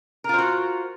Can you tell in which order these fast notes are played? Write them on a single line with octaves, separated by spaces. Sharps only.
A#4 F4 C5 F#4